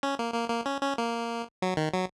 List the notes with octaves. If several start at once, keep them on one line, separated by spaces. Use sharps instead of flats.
C#4
A#3
A#3
A#3
C#4
C#4
A#3
F#3
D#3
F#3